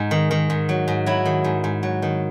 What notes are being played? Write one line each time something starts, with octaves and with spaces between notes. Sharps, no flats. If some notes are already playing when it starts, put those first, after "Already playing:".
Already playing: G#2 D#4
D#3
D#3
G#2
F#3
G#2
F#3 E4
D#3
G#2
G#2
F#3
D#3